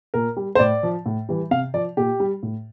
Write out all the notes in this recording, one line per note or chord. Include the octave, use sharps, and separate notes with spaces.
A#2 A#4
G3
C5
A2 D5
F3
A2
E3 G3
C3 F5
F3 D5
A#2 G4
G3
A2